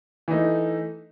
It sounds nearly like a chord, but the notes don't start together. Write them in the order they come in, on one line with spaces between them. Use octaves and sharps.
E3 D#4 A3